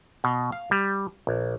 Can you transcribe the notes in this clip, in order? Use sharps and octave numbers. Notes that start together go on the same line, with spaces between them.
B2
F5
G3
A#1